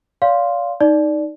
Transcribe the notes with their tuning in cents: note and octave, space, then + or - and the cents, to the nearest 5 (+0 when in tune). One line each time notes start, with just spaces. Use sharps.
D5 -40 F5 +0 C6 +0
D#4 +0 D5 +0